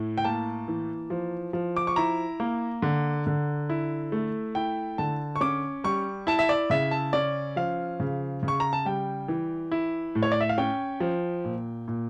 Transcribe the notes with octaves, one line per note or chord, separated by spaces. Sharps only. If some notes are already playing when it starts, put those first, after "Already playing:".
Already playing: A2 E4
G5
A#3 A5
E3
F3
F3
D6
C#6
E4 A#5
A#3
D3
D3
E4
A3
E4 G5
D3 A5
C#6
C#4 D6
G3 C#6
E4 A5
E5
D5
C#3 E5
A5
C#4 D5
F3 F5
C#3
C#3
C#6
A#5
A5
G3 G5
E3
E4
A2
C#5
D5
E5
F5
C#4 G5
F3
A#2
A#2